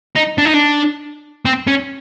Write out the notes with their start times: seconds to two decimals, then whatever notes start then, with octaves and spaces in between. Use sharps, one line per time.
0.16 D#4
0.38 D4
0.45 D#4
0.54 D4
1.45 C4
1.68 C#4